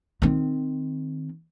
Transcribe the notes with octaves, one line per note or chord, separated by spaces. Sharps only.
D#3 C4